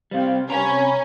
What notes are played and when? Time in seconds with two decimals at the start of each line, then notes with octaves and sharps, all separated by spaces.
0.11 C3 G3 C5 F5 G5
0.50 C3 C#4 A#5 B5